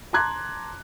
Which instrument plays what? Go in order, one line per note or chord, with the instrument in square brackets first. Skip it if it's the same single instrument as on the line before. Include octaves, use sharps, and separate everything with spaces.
[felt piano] A5 A#5 C6 D6 F#6 G#6